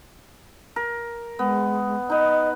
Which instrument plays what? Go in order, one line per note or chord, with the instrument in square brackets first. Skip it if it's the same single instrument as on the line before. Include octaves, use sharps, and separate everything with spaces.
[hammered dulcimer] A#4
[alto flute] G#3 [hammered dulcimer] B3
[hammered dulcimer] D#4 B4 [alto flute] D#5